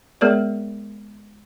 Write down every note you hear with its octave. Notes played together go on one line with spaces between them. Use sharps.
G#3 B3 G#4 A#4 C#5 D5